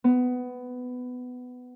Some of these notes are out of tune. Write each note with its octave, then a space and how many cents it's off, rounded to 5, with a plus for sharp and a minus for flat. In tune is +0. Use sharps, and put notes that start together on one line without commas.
B3 +15